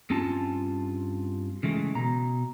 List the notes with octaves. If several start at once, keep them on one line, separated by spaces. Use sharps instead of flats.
G2 C4 C#4 F4 A5
C#3 E3 G#3 A3
B2 A#5